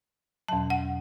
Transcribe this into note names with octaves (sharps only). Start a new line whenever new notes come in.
E2 B2 F#3 A5
F#5